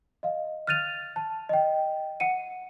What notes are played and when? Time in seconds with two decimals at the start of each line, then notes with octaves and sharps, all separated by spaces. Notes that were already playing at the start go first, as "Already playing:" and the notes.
0.23 D#5 F5
0.67 F6 F#6 A6 D#7 F7
1.16 A5
1.49 D#5 G5
2.20 F#5 C#7 D#7